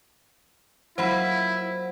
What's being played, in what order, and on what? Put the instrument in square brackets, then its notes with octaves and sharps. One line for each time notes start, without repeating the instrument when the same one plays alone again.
[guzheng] F#3 A#3 F4 [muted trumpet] E4 [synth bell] C5 F#5 B5